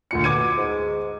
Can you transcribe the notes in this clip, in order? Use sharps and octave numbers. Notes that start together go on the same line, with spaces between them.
D2 A#2 C#7
B2 D6 G#6 D#7
G#2